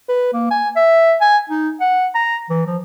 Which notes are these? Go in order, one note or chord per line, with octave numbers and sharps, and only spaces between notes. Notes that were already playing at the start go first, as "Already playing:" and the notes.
B4
A#3
G#5
E5
G#5
D#4
F#5
A#5
E3
F3